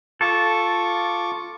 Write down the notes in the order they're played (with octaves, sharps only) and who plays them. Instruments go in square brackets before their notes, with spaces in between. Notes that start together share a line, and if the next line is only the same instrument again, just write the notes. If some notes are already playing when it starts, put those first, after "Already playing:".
[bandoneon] F4 C#6 D6 [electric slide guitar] A4